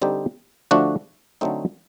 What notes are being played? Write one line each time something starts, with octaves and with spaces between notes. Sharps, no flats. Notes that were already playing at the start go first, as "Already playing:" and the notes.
D3 G3 C4 D#4 G4
D3 F3 A3 D4 F#4
D3 F#3 A3 C4 D#4